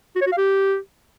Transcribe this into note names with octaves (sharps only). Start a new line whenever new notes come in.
F#4
C#5
F#4
F5
G4